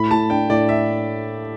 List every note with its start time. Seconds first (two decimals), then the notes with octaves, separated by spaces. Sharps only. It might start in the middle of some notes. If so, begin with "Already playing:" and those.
Already playing: A2 B5
0.11 A2 A5
0.30 D4 G5
0.49 A2 D5
0.69 E5